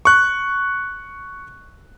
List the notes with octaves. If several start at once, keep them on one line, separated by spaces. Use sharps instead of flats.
C#6 F#6